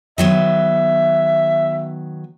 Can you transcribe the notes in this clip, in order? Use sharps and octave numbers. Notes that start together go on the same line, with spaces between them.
D#3 F#3 B3 E5